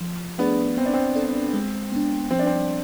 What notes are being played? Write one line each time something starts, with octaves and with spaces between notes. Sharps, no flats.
F3
A3 B3 D4 G#4 D5
B3 C4
D4
C4
D4 A4 D5
G#3
B3 D4
F3 C4
D4
C4